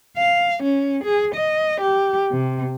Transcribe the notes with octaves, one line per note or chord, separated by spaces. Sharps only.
F5
C#4
G#4
D#5
G4
C3